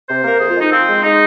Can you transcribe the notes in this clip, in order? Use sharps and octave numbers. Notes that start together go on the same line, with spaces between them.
C3 C5
A#3 A#4
F2 G#4
F4
G#3
D#4
F3 C4
G#3
G#3 D#4